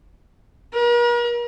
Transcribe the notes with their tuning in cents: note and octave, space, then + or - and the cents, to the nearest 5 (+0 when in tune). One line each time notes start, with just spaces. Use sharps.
A#4 +45